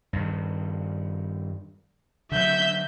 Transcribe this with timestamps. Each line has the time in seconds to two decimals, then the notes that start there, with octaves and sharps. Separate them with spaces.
0.13 G2 D#3
2.32 D3 F#3 E5 G6